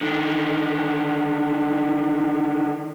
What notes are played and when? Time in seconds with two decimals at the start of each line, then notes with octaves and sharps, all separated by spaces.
0.01 D3 D#3